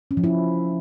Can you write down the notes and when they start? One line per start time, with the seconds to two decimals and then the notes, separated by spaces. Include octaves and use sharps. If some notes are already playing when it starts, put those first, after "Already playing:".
0.11 C#4
0.17 F3
0.24 E4